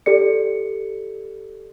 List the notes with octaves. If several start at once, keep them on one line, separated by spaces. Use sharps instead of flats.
G4 A4 D5 C#7